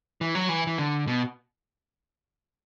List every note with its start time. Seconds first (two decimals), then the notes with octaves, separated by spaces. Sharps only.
0.21 E3
0.35 F#3
0.49 E3
0.67 E3
0.78 D3
1.07 B2